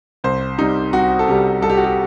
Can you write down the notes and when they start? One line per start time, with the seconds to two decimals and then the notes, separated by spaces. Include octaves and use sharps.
0.24 C2 C5
0.58 C3 G3 D#4
0.93 C2 F#4
1.19 A4
1.27 C3 G3 G4
1.62 C2 A4
1.70 G4
1.77 F#4
1.84 G4